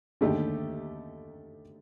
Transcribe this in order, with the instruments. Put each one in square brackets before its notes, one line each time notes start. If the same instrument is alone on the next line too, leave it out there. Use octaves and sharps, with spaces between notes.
[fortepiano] D#2 D3 A3 D#4 G4